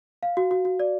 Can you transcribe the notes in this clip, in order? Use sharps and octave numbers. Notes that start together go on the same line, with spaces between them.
F5
F#4
F#4
F#4
D5